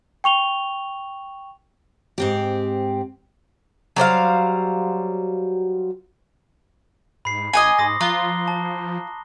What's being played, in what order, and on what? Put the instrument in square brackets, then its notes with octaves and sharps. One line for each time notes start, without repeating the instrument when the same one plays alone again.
[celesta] G5 C#6 F7 G7
[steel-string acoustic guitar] G#2 C4 G4
[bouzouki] F#3 G3 C5 F5
[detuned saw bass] G#2 [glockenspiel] B5 C7
[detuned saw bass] A1 [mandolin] D#5 F#5 G#5 [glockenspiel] D6 C7
[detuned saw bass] G#2 [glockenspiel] C6 D#6 A#6
[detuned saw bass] F3 [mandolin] F4 [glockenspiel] A#5 F#6 G7
[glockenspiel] A5